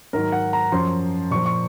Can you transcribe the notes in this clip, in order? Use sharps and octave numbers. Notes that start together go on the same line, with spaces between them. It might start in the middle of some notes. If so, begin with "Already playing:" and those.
G#2 D#3 F#3 A#4
F#5
A#5
F#2 F3 C6
A#2 F3 C#6
C#6